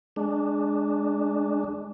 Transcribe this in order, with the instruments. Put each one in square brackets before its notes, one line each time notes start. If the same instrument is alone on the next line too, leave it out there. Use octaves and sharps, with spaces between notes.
[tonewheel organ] G#3 D4